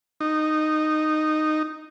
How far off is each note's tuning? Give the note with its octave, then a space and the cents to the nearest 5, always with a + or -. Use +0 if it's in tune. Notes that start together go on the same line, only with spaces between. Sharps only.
D#4 -10